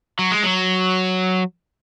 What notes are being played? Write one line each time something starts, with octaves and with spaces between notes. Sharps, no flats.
F#3
G#3
F#3